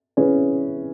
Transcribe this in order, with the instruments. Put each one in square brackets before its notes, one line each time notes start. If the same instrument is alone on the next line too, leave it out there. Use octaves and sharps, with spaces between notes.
[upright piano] E3 C#4 G#4 B4